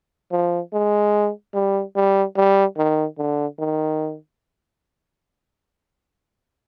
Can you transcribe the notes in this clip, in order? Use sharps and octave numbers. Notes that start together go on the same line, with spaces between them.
F3
G#3
G3
G3
G3
D#3
D3
D#3